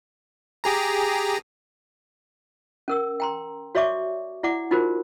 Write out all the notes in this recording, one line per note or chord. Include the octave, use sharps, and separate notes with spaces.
G4 G#4 A#5
C#4 A#4 E6
G5 A#5 C6
F#4 C#5 D5 E5 C#6 D6
E4 D5 F#5 D6
D#4 F4 F#4 A#4 C5